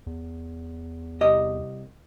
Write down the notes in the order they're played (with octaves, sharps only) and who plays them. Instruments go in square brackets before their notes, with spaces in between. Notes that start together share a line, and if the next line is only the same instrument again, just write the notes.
[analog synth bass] E2
[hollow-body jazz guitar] C2 G4 D#5